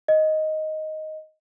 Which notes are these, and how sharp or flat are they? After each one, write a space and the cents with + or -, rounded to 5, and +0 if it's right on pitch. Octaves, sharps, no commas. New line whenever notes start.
D#5 +5